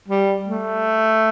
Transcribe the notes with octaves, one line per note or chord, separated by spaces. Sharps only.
G3
A3